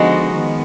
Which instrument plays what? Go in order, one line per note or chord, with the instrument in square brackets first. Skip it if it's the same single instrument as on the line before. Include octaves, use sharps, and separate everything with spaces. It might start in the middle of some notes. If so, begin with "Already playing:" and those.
Already playing: [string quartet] D3 F3 B3 D#4 F#4 [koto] G#3
[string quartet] D#3 B3